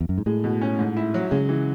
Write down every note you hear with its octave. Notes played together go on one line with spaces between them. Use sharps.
E2
F#2
G#2
A2 G#3
B2
C#4
G#2
E4
F#3
C#3 G#3
E3